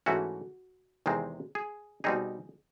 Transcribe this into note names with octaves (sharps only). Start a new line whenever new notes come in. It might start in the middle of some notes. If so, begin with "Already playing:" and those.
G#2 E3 A3 C#4 F#4
E2 C3 D#3 G#3 C4
G#4
B2 G3 C4 D#4 G#4